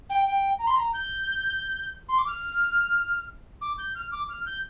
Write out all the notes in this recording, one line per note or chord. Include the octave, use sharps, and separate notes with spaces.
G5
G5
A#5
C6
A#5
G6
C6
D6
F6
D6
G6
F6
D6
F6
G6